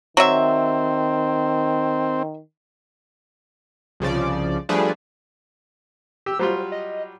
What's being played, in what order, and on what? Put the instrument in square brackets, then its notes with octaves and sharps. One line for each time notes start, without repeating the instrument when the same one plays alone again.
[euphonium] D#3 [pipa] F#3 E5 [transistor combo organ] C4
[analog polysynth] C2 C#3 F3 D5
F3 G3 A3 D4 G#4 B4
[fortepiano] G4 [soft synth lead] E6
[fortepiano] F#3 G3 F4 [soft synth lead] C5
[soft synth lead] D#5